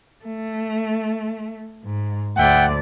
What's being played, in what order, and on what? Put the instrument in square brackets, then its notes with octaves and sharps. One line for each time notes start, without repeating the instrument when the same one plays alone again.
[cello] A3
G#2
[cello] D2 D5 [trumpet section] E5 F#5 G5